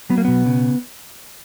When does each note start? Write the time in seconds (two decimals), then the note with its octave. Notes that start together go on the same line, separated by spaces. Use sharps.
0.10 F#3 B3
0.18 A#3
0.25 B2 B3
0.46 C#3